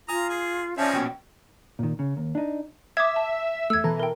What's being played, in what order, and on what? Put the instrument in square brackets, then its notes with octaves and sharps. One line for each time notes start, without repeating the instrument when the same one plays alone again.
[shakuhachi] F4 [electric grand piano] G#5 D#6 [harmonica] A#5
[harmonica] G#4
[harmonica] F3 C4 D#4 [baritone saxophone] C#4 [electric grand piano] D5 E5 [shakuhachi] A5
[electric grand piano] A#1 B2 [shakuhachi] G5
[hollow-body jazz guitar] A#2 D#3
C#3
D#2
D4 D#4
[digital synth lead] E5 [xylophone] D6 D#6 G#6
[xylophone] A5
[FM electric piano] E2 A3 [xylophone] E6 G#6
[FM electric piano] B2 A4 A#5 [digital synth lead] E3
[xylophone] A#4 G5